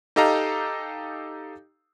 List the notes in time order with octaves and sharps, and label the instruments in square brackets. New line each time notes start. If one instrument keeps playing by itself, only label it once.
[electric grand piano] D#4 G4 A4 D#5 F5 A#5